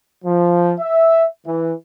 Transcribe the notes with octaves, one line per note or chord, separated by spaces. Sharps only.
F3
E5
E3